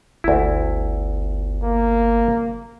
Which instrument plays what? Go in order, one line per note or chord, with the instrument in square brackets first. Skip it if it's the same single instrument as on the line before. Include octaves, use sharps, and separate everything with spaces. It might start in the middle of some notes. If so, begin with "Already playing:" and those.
[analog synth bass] G1 [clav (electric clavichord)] D2 E4
[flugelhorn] A#3